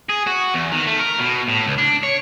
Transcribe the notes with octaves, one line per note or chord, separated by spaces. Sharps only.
G#4
F#4
E2
D#3
A3
A#4
B2
A2
C#2
D4
C#5